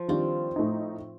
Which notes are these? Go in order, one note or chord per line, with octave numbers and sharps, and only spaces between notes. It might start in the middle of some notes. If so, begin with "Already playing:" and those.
Already playing: F3
D#3 G3 C4 D4 F4
A2 A3 D#4